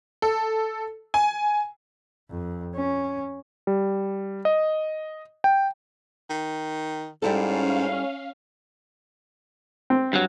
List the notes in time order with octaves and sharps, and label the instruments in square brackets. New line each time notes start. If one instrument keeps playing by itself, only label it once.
[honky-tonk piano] A4
G#5
[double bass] F2
C#4
[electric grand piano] G3
D#5
G5
[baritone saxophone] D#3
[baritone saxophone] G#2 [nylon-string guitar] G3 E4 A4 [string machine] C#4 F5
[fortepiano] C4
[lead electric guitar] G2 F#3